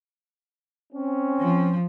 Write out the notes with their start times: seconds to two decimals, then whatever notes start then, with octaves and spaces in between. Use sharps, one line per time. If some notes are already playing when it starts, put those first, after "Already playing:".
0.93 C4 C#4
1.41 F3